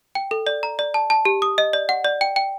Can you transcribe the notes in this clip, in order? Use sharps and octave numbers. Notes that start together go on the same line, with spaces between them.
G5
A4
D5
A#5
D5
A5
A5
G4
D#6
D#5
D5
F#5
D5
G5
G5